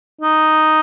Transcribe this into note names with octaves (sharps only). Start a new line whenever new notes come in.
D#4